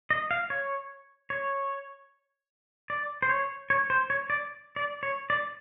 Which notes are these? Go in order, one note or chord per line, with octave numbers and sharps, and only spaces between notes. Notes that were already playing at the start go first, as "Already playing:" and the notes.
D#5
F5
C#5
C#5
D5
C5
C#5
C#5
C5
C#5
D5
D5
C#5
D5